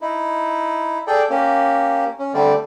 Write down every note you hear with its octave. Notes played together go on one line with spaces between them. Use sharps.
D#4 E4
G#4 A4 D5 G5
A#3 C#4 G4
C#4
D3 G3 A3 C4 D5